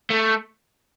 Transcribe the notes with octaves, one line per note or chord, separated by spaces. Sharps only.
A3